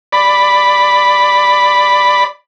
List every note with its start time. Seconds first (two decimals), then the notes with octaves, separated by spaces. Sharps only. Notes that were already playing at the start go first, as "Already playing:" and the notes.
0.12 D5 B5